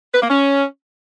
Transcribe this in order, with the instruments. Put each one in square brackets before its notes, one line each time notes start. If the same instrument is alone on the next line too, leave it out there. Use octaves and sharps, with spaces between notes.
[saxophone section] B4
A#3
C#4